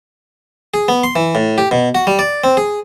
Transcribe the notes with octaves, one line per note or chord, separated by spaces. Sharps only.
G#4
B3
C6
E3
A2
G4
B2
F#4
G3
D5
C4
G#4